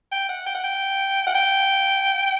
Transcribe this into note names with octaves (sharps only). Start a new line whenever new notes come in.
G5
F#5
G5
F#5
G5
F#5
G5